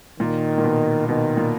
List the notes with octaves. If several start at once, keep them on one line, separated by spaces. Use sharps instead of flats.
A#2 D#3
A#2
B2
B2 D#3
A#2